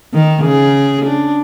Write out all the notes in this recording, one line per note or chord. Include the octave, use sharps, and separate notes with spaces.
D#3
C#3 G#4
D4